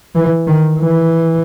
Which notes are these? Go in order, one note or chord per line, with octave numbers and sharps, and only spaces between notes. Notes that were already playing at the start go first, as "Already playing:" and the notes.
E3
D#3
E3